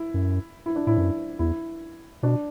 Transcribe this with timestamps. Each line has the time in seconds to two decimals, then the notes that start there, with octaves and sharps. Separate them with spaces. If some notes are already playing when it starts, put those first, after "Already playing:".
Already playing: E4
0.14 F#2
0.66 E4
0.76 D4
0.87 A2 E4
0.98 F#2
1.39 E2 E4
2.23 B2 D4